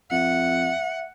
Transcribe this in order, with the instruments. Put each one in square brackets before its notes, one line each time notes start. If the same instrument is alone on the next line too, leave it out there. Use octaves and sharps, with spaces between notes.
[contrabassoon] F2 [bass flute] E5 [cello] F#5